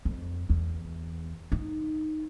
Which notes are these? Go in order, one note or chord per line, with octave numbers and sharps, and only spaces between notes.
F2
E2
D#4